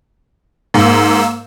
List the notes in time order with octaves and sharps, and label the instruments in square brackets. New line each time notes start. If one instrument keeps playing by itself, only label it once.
[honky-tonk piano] G#2 [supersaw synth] A#3 E6